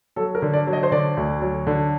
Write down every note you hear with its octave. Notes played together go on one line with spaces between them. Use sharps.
F#3 A4
A#4
D3
D5
F#3
D#5
C5
D3 D5
D2
F#3
D3